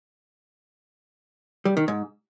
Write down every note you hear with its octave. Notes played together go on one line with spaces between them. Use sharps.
G3
D#3
G#2